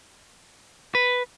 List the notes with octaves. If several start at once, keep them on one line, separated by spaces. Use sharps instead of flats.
B4